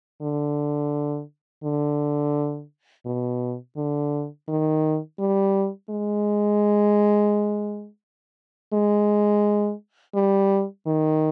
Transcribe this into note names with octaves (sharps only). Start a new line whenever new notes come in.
D3
D3
B2
D3
D#3
G3
G#3
G#3
G3
D#3